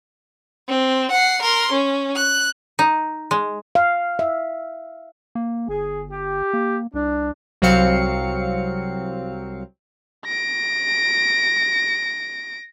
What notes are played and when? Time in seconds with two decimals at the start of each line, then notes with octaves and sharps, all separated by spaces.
0.69 C4
1.11 F#5 C7
1.42 A#4 C6
1.72 C#4
2.16 F#6
2.79 D#4
3.31 G#3
3.75 F5
4.19 E5
5.35 A#3
5.69 G1 G#4
6.10 G4
6.53 A#3
6.94 C2 D4
7.62 C2 F#3 C4 F5 C#7
10.25 A#6 D7